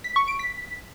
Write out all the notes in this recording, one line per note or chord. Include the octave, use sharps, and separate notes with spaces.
B6
C#6
D7
B6